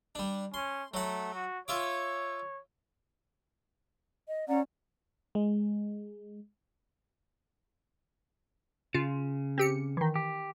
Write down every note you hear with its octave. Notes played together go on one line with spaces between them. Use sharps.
G3 D4
C#4 C6
F#3 A3 F#5
F#4
F4 C#5 E5 D6
D#5
C#4 D5 F#5 A#5
G#3
C#3 F4
C4 G4 C#7
D#3 E3
G4